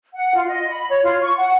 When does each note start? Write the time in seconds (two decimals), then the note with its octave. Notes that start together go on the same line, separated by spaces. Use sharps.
0.15 F#5
0.35 F4
0.48 D#5
0.70 B5
0.89 C#5
1.03 F4
1.21 C#6
1.36 F#5